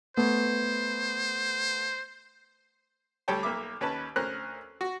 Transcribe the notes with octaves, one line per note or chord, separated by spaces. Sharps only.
A3 B3 C5
D2 G3 C#5 G5 A5
B1 A#3 E5 D6
D#2 C#4 B4 A5
D2 C#4 A#4 C5 F6 F#6
F#4